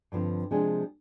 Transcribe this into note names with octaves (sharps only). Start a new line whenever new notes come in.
G2 D3 F3 C4
C3 F3 G#3 D4 G#4